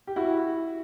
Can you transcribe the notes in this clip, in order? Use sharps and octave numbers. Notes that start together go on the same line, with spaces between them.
G4
E4 F#4